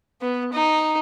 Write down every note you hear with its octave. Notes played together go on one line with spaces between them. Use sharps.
B3
D#4